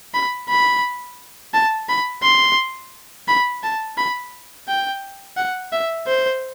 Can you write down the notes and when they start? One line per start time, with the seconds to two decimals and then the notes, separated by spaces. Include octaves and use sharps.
0.14 B5
0.49 B5
1.54 A5
1.89 B5
2.23 C6
3.28 B5
3.63 A5
3.98 B5
4.68 G5
5.37 F#5
5.72 E5
6.07 C5